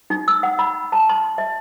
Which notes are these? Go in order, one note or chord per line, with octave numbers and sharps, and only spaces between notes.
D#4
E6
F#5
B5
A5
C6
E5